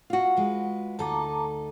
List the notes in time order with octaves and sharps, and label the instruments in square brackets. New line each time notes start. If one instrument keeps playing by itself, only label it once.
[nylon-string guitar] F4 F#4
[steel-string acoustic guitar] G#3 B4
[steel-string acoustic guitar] D2 D#4 A4 [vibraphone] A5 A#5 D6